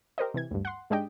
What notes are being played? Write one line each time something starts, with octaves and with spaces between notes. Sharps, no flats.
G4 A#4 C5 D#5
C3 E3 G#6
D2 G2
F#5 C6
G#2 G#3 D4 G4 D#5 G5